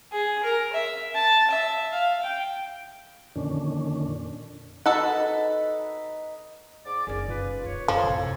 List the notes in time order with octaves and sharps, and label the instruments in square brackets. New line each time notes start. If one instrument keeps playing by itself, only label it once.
[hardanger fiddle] G#4
A#4
E5
A5
E5
F5
G5
[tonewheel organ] F2 A#2 D3 D#3 C#4 D4
[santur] D#4 B4 [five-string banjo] F#4 A4 F#5
[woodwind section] G#2 D5 D6
[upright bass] F#1 D#4 [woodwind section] G#4 A#4 D5
[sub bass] F#2 [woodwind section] F4 B4
[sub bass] D#1 [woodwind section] C#5
[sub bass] F2 [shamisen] F3 [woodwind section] A4 C#5
[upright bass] A1 C3 [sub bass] F2